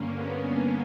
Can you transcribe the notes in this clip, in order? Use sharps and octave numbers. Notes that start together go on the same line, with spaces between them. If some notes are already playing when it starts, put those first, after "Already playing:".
Already playing: G2 D3 A#3 C#4
B3
A#3